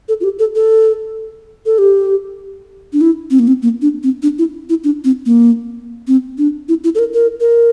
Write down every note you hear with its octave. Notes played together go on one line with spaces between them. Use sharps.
A4
F4
G4
A4
A4
A4
G4
D4
E4
C4
A#3
C4
A#3
D4
C4
D4
E4
E4
D4
C4
A#3
C4
D4
E4
E4
A4
A#4
A#4
A#4